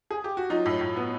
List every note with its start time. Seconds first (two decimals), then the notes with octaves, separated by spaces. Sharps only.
0.11 G#4
0.24 G4
0.37 F#4
0.50 F#3 D#4 F4
0.66 A2
0.81 A2
0.96 B3